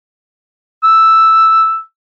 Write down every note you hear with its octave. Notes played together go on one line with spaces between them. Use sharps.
E6